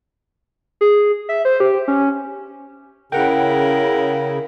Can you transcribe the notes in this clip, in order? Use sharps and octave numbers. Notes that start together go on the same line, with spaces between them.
G#4
E5
C5
G4
C#4
C#3 E4 A#4 F#5 G5